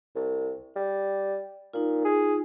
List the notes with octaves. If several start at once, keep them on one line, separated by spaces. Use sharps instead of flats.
C2
G3
A#2 D#4 F4
G#4